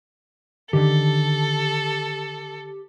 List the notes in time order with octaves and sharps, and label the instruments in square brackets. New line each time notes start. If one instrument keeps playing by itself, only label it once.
[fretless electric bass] D3 D#3 [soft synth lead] G4 [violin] A4